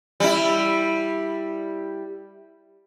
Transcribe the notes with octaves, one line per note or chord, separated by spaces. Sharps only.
G3 E4